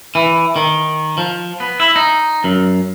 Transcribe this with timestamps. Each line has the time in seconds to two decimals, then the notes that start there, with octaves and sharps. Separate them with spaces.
0.15 E3
0.56 D#3
1.18 F3
1.60 B3
1.80 E4
1.96 D#4
2.44 F#2